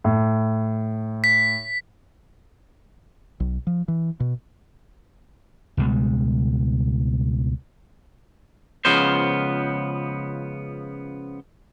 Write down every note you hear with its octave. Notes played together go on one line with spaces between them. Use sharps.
A2
B6
B1
F3
E3
B2
C#2 B2 G3 G#3
C#2 C#3 F3 B3 C5